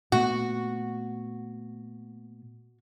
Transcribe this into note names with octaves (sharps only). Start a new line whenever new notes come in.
A#2 A3 B3 F#4